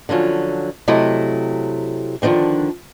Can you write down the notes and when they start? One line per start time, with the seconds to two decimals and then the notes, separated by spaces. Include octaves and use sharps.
0.09 D3 F3 F#3 C#4
0.88 C3 F#3 A3 E4 D#5
2.22 D3 D#3 F3 C4 D4